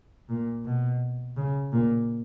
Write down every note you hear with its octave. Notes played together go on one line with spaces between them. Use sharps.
A#2
B2
C#3
A#2